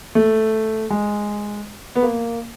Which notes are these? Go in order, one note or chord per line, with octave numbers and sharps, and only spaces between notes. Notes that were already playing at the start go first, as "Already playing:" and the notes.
A3
G#3
B3
A#3